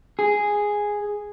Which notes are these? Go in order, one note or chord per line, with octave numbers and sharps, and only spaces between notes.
G#4